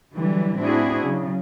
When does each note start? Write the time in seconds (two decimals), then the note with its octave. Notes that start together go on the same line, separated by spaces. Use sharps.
0.14 D3 E3 F#3 G3
0.59 A2 C4 D4 E4 F#4 G#4
1.03 C#3 F#3